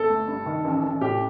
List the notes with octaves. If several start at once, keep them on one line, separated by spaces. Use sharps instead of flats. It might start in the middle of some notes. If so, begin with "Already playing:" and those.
Already playing: G1 A4
A3
G2
D#3
A1
A1
A2 G4